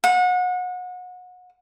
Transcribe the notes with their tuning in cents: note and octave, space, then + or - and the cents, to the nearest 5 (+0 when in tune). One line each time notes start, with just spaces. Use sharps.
F#5 -30